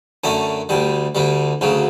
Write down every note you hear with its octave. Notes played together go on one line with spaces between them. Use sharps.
F#2 D3 A3 C#4
D2 D3 G3
D2 D3 G3
D2 C#3 F#3